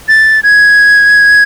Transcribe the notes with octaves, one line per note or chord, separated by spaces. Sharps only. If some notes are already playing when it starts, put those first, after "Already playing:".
A6
G#6